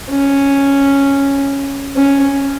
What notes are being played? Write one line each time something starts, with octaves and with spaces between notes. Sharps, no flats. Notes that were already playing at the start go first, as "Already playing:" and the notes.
C#4
C#4